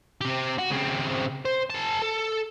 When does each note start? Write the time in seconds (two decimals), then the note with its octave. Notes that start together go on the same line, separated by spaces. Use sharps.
0.21 C4 G4
0.59 F#4
0.71 C#3 C4
1.45 C5
1.70 G#4 A5
2.02 A4